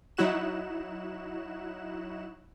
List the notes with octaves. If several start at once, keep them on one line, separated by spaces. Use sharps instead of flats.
F#3 D#4 E4 F#4 F#6 E7